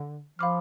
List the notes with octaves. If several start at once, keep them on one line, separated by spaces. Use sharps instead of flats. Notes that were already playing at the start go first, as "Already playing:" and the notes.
Already playing: D3
F3 F5 B5 D6 F6